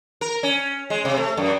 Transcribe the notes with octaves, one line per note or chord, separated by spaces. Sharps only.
A#4
C#4
G#3
C3
A3
F#2